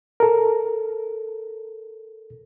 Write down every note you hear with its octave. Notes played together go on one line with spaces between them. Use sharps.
A4 A#4